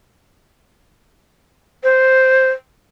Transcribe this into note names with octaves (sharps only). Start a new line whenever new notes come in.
C5